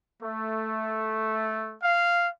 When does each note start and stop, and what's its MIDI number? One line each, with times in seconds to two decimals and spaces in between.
0.22 1.75 57
1.83 2.28 77